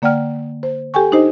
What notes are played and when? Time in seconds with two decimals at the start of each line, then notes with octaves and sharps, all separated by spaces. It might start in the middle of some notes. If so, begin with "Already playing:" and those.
0.02 D3 A#3 D5 F#5 G5 F6
0.63 C5
0.94 G4 A4 G5 G#5 C#6
1.12 D4 D#4 G4 C5 D#5